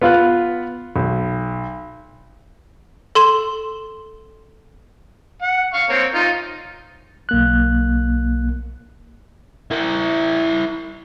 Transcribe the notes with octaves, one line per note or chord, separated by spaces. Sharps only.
B3 F4 B4 F5 F6 F#6
B1
A4 C6 E7
F#5
F5 C#6
A#3 C4 C#5
D#4 F4
B1 A#3 F#6
E4 A#4